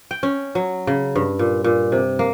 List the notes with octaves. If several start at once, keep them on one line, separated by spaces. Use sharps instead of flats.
G5
C#4
F#3
C#3
G2
A#2
A#2
C3
A#3